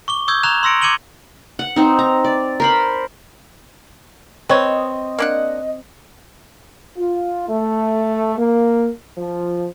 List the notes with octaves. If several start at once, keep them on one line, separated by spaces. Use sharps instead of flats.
C#6 D6 G7
C#6 D#6 E6 G6 G#6
A#5 C#6 F#6 G#6 E7 F7
C6 E6 A#6 C#7 D7
D6 G#6 C#7 D#7 F#7 G7
F#5
C4 D#4
A#5
D5
A#4 C5 B5
C4 B4 C#5 D#5
A#3 D4 F#5
F4
A3
A#3
F3